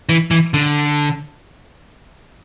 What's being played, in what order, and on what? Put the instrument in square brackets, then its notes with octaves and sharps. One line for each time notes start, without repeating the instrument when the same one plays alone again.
[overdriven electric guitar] E3
E3
D3